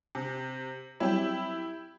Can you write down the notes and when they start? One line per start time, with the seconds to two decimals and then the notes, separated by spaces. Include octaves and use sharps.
0.15 C3
1.00 F#3 G3 C4 E4 G4